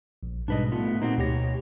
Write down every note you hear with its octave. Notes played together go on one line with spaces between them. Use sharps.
A#1
G#2 B2 G3 D4 B4 D#5
A2 A3 B3 F4
A#2 A#3 C4 D#4 F#4
D2 B2 G4 C#5 A#6